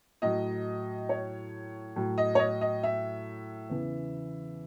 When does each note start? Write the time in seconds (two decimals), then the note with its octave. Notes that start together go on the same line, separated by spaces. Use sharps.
0.22 A2 F#3 D#5
1.09 C#5
1.96 A2 F#3
2.18 D#5
2.35 C#5
2.39 D#5
2.61 D#5
2.83 E5
3.70 E2 C#3 E3